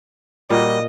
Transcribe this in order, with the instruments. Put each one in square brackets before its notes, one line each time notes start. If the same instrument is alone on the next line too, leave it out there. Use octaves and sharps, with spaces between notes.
[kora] A#2 [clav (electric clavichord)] G3 A#3 F#4 [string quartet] D#5